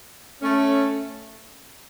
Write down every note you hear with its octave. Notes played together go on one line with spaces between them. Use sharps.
A3 C#4